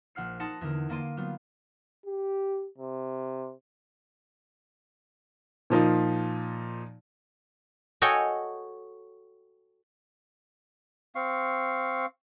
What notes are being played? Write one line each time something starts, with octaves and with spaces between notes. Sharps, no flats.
A#1 F#5 F6 C7
D#4 F#5 A5 C6 A#6 C#7
E2 D3 A#4
D3 A#3 D5 C6 D#7
F#3 G3 B3 F4
G4
C3
A#2 F3 D#4 F4
F#4 A4 C#5 D#5 G5 G#5
C4 F5 C#6